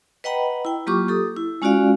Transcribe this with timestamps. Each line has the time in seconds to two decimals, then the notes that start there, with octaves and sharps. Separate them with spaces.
0.24 B4 D#5 F#5 G5 A#5 B5
0.65 E4 G5
0.87 F#3 A#3 F4 G4 C#6 D6
1.08 G4 A4 D#6
1.37 E4
1.62 G#3 C#4 F4 F#4 D5 F5